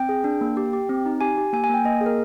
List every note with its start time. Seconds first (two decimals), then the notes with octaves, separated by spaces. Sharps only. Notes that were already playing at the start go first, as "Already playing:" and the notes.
Already playing: C4 G5
0.09 G#4
0.24 D4
0.41 A#3
0.57 G4
0.73 G4
0.89 C4
1.06 D#4
1.21 G4 G#5
1.38 G4
1.53 A#3 G#5
1.64 G#5
1.69 A#3 G5
1.85 A#3 D#5
2.01 G#4
2.06 A#4